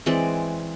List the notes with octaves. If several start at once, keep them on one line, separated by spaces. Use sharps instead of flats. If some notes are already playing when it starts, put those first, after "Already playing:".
E3 G#3 C4 D5